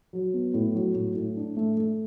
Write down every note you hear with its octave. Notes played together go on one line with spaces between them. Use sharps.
F#3
B3
A2
F#3
A2
A2
D4
A3
A3